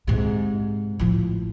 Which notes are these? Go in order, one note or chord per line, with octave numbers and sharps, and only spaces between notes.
G#2 C3
A1 F3